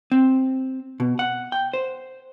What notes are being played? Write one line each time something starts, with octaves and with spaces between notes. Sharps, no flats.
C4
B2
F#5
G5
C5